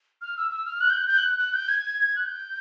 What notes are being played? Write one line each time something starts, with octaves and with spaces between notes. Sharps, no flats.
F6
E6
E6
F6
F#6
G6
F#6
G6
F#6
F#6
G6
G#6
F#6
G6